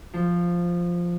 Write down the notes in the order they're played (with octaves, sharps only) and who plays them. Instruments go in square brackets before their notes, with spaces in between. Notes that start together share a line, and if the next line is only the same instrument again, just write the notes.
[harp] F3